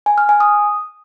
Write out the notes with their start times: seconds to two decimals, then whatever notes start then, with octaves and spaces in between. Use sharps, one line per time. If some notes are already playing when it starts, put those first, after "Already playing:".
0.06 G#5
0.18 F6
0.29 G#5
0.40 D#6